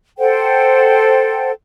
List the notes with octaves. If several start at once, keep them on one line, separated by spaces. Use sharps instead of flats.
A4 C5 F#5 G5